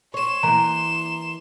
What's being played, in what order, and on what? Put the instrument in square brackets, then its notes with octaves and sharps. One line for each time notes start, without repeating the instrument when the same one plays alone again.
[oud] C#5 [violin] C6 E7
[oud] E3 A#3 [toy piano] A#5